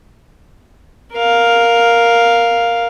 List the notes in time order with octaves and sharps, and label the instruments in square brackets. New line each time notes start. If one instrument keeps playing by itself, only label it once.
[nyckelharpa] A#4 F5